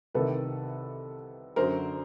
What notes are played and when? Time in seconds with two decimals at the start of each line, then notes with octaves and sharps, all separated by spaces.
0.14 C2 C3 D#3 A4 B4
1.56 F#2 D3 F#3 A#4 C5